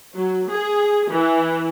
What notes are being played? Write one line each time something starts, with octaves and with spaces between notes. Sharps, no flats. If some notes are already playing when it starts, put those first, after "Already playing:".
F#3
G#4
E3